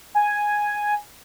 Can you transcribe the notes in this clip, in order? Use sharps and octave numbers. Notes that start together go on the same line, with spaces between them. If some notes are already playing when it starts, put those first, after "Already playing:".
G#5